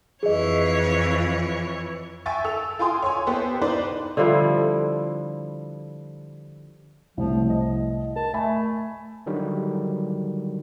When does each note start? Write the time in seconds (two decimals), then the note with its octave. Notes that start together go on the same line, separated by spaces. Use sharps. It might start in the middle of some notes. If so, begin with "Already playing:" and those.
0.23 F2 E3 G#4 C#5 D#5
2.26 E5 G5 G#5 C#6 A6
2.44 A4 E6 F7
2.79 F4 G5 G#5 C6 D#6
3.02 C#5 G#5
3.27 B3 G4 A4 C5
3.62 D4 D#4 B4 C5 D5
4.17 D3 F3 G3 E4
7.17 C2 A2 F3
7.49 D#5
8.16 A#4 A5
8.34 A3 E5 G#5 B5
9.26 D3 D#3 F#3 G3